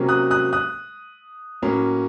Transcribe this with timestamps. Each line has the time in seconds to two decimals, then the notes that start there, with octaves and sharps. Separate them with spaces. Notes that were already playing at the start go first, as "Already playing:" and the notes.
Already playing: C3 F#3 A#3 C#4
0.09 D#6 F#6
0.31 D#6 F#6
0.53 D#6 F#6
1.62 A2 F#3 A#3 C#4